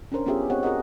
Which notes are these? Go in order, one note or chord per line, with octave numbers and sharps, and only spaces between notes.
C#4 D4 A#4 C5
B3 C#4 F4 G4 G#4 E5
B3 C4 G4 C#5 D#5 F#5
F#4 G#4 A#4 D#5 F#5